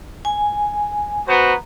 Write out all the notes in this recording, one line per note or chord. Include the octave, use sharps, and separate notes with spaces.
G#5
B3 F#4 C5 A#5